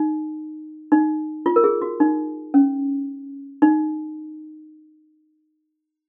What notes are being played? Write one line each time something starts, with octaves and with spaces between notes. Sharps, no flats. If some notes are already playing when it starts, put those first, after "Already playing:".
Already playing: D#4
D#4
F4
A#4
G#4
F#4
D#4
C#4
D#4